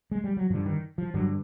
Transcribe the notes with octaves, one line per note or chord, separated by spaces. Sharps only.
G#3
G3
F#3
G2 D3 F3
D#3
F3
G2 D3 F#3